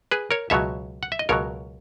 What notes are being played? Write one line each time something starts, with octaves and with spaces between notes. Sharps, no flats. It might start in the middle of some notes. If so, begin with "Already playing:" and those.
G#4 B4
A#4 C#5
C#2 B2 F#3 C#5 E5
F#5
E5
D#5
C#2 B2 F#3 A#4 C#5